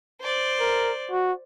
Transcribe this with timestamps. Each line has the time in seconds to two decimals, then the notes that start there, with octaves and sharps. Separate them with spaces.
0.20 C5 D5
0.60 A#4
1.11 F#4